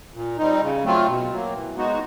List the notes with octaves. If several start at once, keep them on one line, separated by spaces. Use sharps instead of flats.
A#2
G3 C4 D#4
C#3
F#3 A3 C4 F4
B2
F#3 A#3
E3
G#3 B3 D#4 F#4